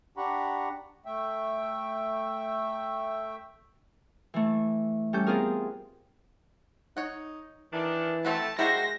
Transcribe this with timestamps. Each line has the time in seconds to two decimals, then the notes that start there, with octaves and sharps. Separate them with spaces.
0.17 D4 G4 F#5 A#5 B5 C#6
1.06 A3 E5 G5
4.34 E3 A3
5.13 G3 C#4 A4 G6
5.26 B3 C4 F4 G#4 A#4
6.97 D#4 C#5 F#5
7.73 D#3 E3 D4
8.25 A3 C4 F#4 B4 A5
8.59 G#3 E4 F#4 G4 A#4 C5 A#6